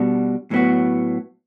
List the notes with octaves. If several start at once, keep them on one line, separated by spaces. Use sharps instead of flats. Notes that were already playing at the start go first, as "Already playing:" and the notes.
Already playing: B2 G3 D4 F#4
A2 F#3 B3 F#4